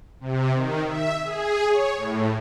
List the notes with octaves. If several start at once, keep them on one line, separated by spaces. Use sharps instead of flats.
C3
D#3
E5
G#4
C#5
A2